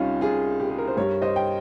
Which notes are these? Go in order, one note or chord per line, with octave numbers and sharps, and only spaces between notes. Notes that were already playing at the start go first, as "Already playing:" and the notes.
Already playing: C2 C3 G3 C#4 D#4 F4
F4 G#4
G4
G#4
A#4
C5
G2 G3 A#4 C#5
C5 D#5
G5